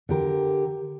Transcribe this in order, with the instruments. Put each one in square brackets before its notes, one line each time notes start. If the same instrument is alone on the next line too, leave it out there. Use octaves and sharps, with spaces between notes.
[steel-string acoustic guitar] D3 G4 A#4